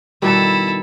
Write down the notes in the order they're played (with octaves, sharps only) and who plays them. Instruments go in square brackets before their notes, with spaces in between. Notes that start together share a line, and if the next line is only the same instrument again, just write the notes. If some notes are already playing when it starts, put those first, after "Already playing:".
[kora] B2 D#3 G3 [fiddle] E4 A4